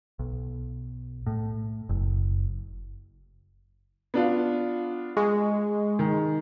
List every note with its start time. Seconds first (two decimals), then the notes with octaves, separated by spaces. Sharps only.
0.19 B1
1.27 A2
1.89 F#1
4.14 B3 D4 F4
5.17 G#3 C#6
5.99 D#3